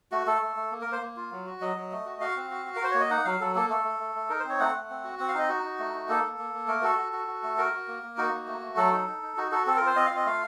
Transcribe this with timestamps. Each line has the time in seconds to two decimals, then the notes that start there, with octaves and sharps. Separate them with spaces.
0.12 A3 F#4
0.27 A3 A4
0.41 A3
0.56 A3
0.72 A#3
0.81 A#4
0.87 A#3
0.92 C5
1.01 A#3
1.17 F4
1.32 F#3
1.46 F#4
1.61 F#3 D#5
1.76 F#3
1.92 A3
2.06 F#4
2.21 F#4 F5
2.36 C4
2.51 F#4
2.66 F#4
2.76 A#4
2.81 F#4 C5
2.91 A#3 C#5
3.00 D#5
3.10 D#4 F#5
3.25 F#3 F5
3.41 F#3 A4
3.55 A#3 A4
3.70 A3 A4
3.84 A3
4.00 A3
4.15 A3
4.29 D#4 A#4
4.40 C4 C5
4.49 C#5
4.60 A3 F#5
4.74 A3
4.90 C4
5.04 F#4
5.19 C4 F#5
5.28 F5
5.34 D#4 D#5
5.49 F#4
5.63 D#4
5.79 A3
5.94 D#4
6.09 A#3 A4
6.23 A#3
6.38 A#3
6.54 A#3
6.68 A3 A#4
6.83 F#4 A4
6.98 F#4
7.13 F#4
7.27 F#4
7.43 A3
7.58 F#4 A#4
7.72 F#4
7.88 A#3
8.02 A#3
8.17 D#4 F#4
8.33 A#3
8.47 A3
8.62 A3
8.77 F#3 A4
8.92 D#4
9.07 D#4
9.22 D#4
9.37 D#4 F#4
9.52 F#4 A4
9.67 C4 A4
9.76 A#4
9.81 F4
9.86 C5
9.96 C4 D#5
10.06 F5
10.11 F4
10.16 D#5
10.26 A3 F5